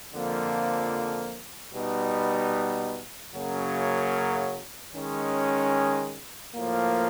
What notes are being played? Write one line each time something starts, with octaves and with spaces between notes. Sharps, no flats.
F2 D3 F3 A#3
B2 G3 B3 D#4
F#2 C#3 F#3 A#3
D#3 G#3 C#4
A2 F3 A#3